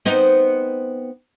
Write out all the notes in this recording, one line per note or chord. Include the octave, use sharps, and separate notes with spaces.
B3 C4 D#4